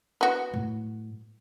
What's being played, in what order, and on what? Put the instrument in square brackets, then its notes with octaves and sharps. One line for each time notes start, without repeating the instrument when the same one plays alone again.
[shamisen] B3 F#4
[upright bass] A2 F#3